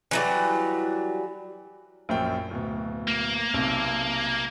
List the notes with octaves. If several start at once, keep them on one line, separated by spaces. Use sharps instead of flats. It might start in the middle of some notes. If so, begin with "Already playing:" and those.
E3 F#3 G3
A#1 F#2 G5
D1 B2
A#3
B1 C3